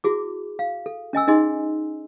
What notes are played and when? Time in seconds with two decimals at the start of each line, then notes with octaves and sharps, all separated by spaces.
0.04 E4 F#4 G#4 D6
0.59 F5
0.86 A4
1.13 C#4 D#5 G#5 E6
1.27 C#4 D#4 G#4 D#5 G#5 C6